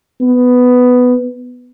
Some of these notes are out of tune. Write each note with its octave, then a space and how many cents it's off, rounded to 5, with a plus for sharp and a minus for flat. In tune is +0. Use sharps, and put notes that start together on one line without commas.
B3 +5